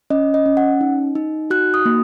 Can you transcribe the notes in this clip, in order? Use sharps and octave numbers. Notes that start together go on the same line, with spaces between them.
C#4 D#5
D#5
C#4
F#5
D#4
D#4
F#4 F#6
D#6
A#3